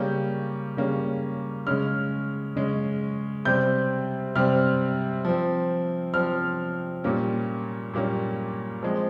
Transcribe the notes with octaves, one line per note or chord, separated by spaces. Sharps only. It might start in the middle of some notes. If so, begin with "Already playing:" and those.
Already playing: C#3 G3 A#3 C#4 G6
C#3 G3 A#3 C#4
C#3 G#3 C#4 F6
C#3 G#3 C#4
C3 G3 C4 G6
C3 G3 C4 F6
F3 C4
F3 C4 F6
A#2 G3 A#3 C#4
A#2 G3 A#3 C#4
F3 G#3 C4